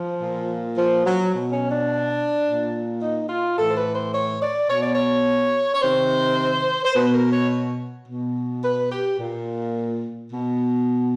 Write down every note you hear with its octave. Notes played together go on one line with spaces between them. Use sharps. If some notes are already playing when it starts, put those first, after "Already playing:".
Already playing: F3
A#2
F3
F#3
B2
C#4
D4
A#2
D#4
F4
A2 E3 A4
C5
B4
C5
C#5
D5
B2 C#5
D5
C#5
C#5
C3 D#3 C5
C5
B2 B4
A#4
C#5
B2
B4
G4
A#2
B2